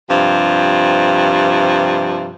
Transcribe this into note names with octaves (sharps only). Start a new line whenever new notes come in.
G2 C3 F3